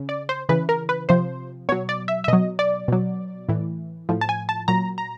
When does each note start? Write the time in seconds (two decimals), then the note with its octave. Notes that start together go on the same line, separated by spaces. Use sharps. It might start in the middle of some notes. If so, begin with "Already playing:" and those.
Already playing: C#3
0.09 D5
0.29 C5
0.49 C#3 E3 B4
0.69 A#4
0.89 B4
1.09 C3 F3 C5
1.69 B2 F#3 C#5
1.89 D5
2.08 E5
2.24 E5
2.28 B2 F#3 D#5
2.59 D5
2.88 B2 F#3
3.49 A2 E3
4.09 A2 F3
4.21 A5
4.29 G#5
4.49 A5
4.68 A#2 F#3 A#5
4.98 A#5